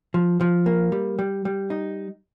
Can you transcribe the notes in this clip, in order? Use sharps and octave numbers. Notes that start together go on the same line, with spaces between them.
F3
F3
A#3
G3
G3
G3
D#4